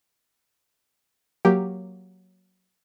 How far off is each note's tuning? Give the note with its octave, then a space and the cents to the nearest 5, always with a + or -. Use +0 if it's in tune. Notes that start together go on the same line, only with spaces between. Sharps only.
F#3 +0 A#3 +0 G4 +0